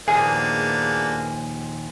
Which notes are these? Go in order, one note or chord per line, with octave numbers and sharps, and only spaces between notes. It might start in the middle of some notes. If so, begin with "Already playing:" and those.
D#2 A#2 F3 A#3 B3 D4 G#4 G#5